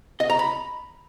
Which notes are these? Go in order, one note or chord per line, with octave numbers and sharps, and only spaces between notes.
D#5
A#5
B5